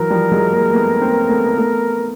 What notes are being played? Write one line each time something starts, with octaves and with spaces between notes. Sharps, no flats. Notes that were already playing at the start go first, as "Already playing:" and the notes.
Already playing: E3 F#3 A#4
F3 G3
F#3 G#3
G#3 A#3
A3 B3
A#3 C4
A3 B3
A3 B3